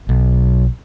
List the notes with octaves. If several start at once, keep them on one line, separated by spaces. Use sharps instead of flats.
B1